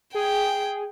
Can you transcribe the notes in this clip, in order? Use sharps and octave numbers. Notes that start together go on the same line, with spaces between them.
G#4 G5